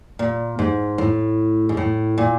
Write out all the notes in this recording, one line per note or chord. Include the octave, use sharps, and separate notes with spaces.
A#2
G#2
A2
G#2
A2
A#2